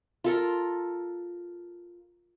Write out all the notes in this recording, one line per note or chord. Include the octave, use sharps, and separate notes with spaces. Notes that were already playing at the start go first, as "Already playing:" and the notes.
F4 A4 A#4